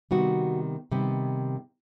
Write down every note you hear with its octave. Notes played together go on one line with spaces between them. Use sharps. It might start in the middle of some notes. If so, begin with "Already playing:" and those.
C3 D#3 G3 B3 F#4
C3 D#3 G3 B3